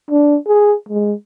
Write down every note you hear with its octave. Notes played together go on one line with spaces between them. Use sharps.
D4
G#4
G#3